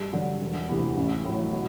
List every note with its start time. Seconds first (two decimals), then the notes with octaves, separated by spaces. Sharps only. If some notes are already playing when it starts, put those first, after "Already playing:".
Already playing: G2
0.13 D3 F#3
0.42 E1
0.69 D2 C3 E3 B3
0.97 A1
1.25 A2 F#3
1.53 B2